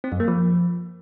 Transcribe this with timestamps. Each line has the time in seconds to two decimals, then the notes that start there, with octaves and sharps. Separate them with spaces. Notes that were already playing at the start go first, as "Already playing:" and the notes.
0.04 C4
0.12 F#2
0.20 A#3
0.28 F3